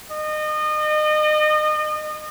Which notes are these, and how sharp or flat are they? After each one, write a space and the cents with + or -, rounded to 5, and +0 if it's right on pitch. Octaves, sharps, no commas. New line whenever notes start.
D#5 -30